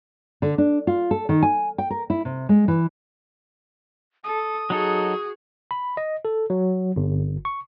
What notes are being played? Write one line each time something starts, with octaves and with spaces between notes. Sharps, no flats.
D3
D4
F4
A4
D#3
G#5
G5
A#4
E4
C3
G#3
E3
A4 D#6
F#3 D#4 F#4 G#4 A4
B5
D#5
A4
F#3
G1
C#6